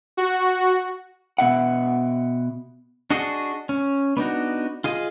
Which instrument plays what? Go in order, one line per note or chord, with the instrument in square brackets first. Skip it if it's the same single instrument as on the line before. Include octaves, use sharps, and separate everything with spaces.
[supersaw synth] F#4
[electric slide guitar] B2 E5 F#5
[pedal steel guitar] D4 F#4 G#4 D#5
C#4
B3 D4 D#4 F#4
F4 G#4 D#5